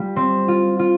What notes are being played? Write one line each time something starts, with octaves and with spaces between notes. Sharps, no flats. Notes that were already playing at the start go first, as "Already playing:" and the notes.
Already playing: G3 F4
C4
F4
F4